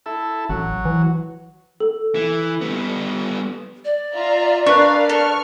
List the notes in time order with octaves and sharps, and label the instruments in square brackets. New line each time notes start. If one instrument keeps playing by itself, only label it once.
[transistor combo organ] E4 A4
[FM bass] A1 [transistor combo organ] F#3
[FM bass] E3
[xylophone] A4
[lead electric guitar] E3
G3 B3
[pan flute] D5
[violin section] F4 E5 A#5
[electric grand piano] D4 B4 [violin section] A#4 F5 [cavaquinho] C#6
[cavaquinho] A4 [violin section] C#6 F6